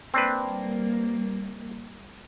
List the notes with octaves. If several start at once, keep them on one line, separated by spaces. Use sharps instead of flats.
G3 A#3 C4 D4 B4